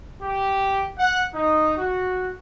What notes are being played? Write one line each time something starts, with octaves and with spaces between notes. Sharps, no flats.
G4
F#5
D#4
F#4